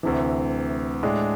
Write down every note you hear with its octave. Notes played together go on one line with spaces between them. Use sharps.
D2 C3 E3
A2 G#3 D4